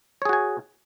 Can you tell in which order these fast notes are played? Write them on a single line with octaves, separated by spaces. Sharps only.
C#5 G#4 F#4 G#5